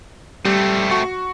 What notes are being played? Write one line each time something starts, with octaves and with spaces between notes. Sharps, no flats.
G3 A3 C4
F#4 C#6